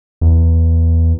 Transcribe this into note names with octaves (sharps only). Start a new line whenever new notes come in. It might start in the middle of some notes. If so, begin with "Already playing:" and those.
E2